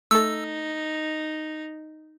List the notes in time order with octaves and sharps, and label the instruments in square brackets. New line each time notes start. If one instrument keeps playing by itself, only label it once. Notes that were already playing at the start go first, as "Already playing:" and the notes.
[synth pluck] A3 A4 [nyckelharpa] D#4 [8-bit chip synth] E6